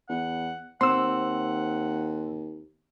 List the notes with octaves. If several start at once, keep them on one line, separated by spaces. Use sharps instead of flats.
E2 F#5
D#2 C4 F#5 C6 E6